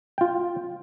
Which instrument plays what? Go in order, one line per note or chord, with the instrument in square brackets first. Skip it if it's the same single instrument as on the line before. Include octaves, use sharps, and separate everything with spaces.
[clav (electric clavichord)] F4 G5